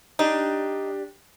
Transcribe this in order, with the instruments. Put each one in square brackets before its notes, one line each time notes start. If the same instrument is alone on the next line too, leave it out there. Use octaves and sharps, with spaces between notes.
[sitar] D4 G4 [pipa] D#4